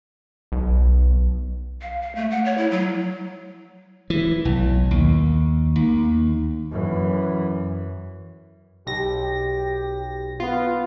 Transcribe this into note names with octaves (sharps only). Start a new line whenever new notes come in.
B1
F5
F5
A3
F#5
C#5
E4
F#3
E3
B1
D#2
D#2
F#2 E3
B1 G4 A#6
B3 F4